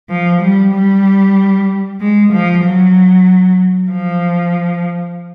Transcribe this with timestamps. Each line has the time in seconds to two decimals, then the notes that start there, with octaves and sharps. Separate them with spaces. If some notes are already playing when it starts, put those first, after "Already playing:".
0.09 F3
0.42 G3
0.74 G3
2.00 G#3
2.32 F3
2.64 F#3
3.91 F3